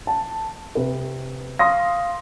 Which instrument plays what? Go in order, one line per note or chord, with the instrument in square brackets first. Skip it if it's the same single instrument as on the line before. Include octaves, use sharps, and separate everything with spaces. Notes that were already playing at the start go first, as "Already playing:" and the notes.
[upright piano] A5
C3 B4
[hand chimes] F5 [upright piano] C6 D#6 A#6